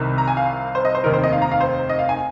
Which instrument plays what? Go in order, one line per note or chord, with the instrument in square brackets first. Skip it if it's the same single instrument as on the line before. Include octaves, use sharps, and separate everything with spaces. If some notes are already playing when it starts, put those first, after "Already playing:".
Already playing: [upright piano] C2 C3 D#3
A#5
G#5
F5
C5
D#5
C5
F1 D#2 D#3 C4 D#4 A#4
C5
D#5
F5
A#5
F5
C5
D#5
F5
G#5